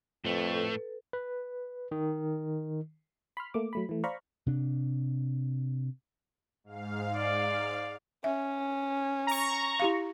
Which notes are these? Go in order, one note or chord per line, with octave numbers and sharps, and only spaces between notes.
F2 A2 A3 A4 B4
B4
D#3
B5 C6 F6
A3 A#3 D6
F#3 A3 B5
E3 A3
C5 D5 F5 A#5 B5 C#6
C3 D4
G#2 F5
D5
C#4 E5
A#5 C#6
E4 G4 F5